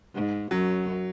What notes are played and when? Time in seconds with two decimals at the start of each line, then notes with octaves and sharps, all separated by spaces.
0.15 G#2
0.51 F#2 F#3